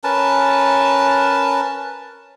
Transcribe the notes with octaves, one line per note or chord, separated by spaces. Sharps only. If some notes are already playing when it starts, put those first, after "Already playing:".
C#4 A#4 B4 A5